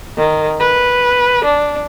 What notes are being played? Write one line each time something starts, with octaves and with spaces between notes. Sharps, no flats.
D#3
B4
D4